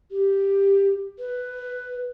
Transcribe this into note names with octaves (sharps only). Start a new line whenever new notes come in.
G4
B4